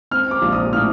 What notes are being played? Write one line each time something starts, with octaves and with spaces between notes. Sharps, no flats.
C4 F6
D6
A#1
D#6
A2 F6